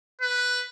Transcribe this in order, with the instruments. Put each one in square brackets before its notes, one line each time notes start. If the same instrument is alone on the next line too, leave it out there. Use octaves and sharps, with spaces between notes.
[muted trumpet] B4